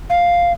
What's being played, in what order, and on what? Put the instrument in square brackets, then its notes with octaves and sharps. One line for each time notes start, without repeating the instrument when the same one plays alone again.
[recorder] F5